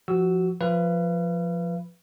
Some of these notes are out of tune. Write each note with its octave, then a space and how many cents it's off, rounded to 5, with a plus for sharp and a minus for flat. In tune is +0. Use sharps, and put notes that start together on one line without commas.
F3 +0 F#4 +15 E6 -10
F3 +0 B4 +0 F5 -40